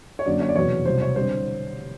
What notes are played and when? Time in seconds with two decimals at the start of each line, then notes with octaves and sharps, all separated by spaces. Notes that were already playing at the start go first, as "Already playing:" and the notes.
0.19 C#5
0.26 F#2 D3 F#3 A#3 D5
0.40 C#5
0.49 D5
0.56 F1 E2 B2 F#3 C#5
0.85 C2 B2 F#3 C5
1.01 C#5
1.16 D3 G3 C4 C5